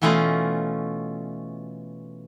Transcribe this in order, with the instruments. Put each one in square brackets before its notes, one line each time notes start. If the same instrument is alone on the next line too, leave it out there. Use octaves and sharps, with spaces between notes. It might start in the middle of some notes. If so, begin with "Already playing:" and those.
[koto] B2 E3 A3 C#4 F4 D#5